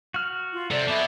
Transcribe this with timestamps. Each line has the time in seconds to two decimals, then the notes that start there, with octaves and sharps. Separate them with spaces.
0.14 F#4 F6
0.51 F4
0.71 C3 A4 D5
0.88 B2 B3 E5 B5 D6